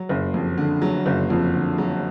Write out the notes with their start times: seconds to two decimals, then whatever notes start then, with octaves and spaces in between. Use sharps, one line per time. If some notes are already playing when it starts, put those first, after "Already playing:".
Already playing: F#3
0.09 F#1
0.34 F2
0.58 D3
0.82 F#3
1.06 F#1
1.30 F2
1.54 D3
1.78 F#3